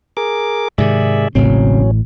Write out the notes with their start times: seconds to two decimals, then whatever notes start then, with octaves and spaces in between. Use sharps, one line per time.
0.17 G#4 A#4 D6
0.78 G#2 C3 D#3 G#4 D5 E5
1.35 E1 A1 A2 C#3 F#3 C4 C#4